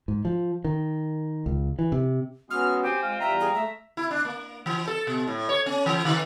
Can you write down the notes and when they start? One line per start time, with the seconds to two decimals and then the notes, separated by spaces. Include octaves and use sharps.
0.08 G#2
0.25 F3
0.65 D#3
1.46 C#2
1.79 E3
1.92 C3
2.50 G#3 B3 C#4 F#4 F6
2.83 C4 G4 G#5
3.03 G#3 F4
3.20 E2 G3 E5 G5 A#5
3.40 G#4
3.55 A3 E5
3.97 E4
4.11 D4
4.25 A#3
4.66 E3
4.87 A4
5.07 B2
5.28 A2
5.49 C#5
5.66 C#4
5.86 E3
6.05 D#3